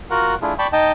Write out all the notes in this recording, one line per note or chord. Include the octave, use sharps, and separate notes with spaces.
F4 F#4 A#4 F#5
A3 D4 E4 F4 G#4
D5 G5 A5 B5 C#6
D#4 D#5 G5 A5